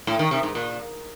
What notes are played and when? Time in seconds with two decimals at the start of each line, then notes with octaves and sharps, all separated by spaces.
0.07 A2
0.19 D#3
0.31 C3
0.43 G#2
0.55 A#2